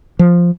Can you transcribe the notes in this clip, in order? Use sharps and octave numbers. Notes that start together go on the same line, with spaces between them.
F3